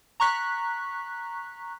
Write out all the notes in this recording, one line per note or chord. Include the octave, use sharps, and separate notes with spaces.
A#5 C#6 F#6 B6